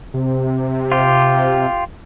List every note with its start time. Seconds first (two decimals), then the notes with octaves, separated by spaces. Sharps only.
0.14 C3
0.92 F4 G4